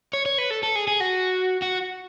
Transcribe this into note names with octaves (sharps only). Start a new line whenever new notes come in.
C#5
C#5
B4
A4
A4
G#4
G#4
F#4
F#4